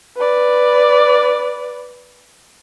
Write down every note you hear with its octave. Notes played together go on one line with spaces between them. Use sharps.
B4 D5